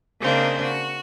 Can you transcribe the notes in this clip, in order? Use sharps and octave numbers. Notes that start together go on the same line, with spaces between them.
C#3 A#3 C4 D4 D#4
F#4